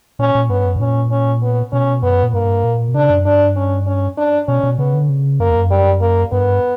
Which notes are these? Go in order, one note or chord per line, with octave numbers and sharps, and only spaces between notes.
A#2 C#4
A#2
G2 B3
F#2
G2
A#2 C#4
C#4
B3
B2 C#4
F#2 B3
A#2
G2 A#3
A#2
B2
C#3 D4
F#2
G2 D4
C#4
C#4
D4
B2 C#4
B2
C#3 B3
D3
C#3
F#2 A#3
E2
F#2
G3
A#3
G2 B3